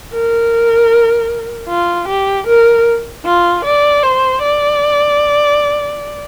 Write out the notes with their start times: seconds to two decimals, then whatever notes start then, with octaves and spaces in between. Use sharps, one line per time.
0.13 A#4
1.69 F4
2.08 G4
2.47 A#4
3.25 F4
3.65 D5
4.03 C5
4.42 D5